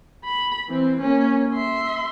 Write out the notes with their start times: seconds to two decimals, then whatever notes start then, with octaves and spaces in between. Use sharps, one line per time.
0.25 B5
0.69 E3 C4
1.01 A#3 C#4
1.54 E5 C6